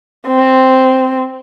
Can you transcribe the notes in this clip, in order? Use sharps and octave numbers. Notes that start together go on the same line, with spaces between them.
C4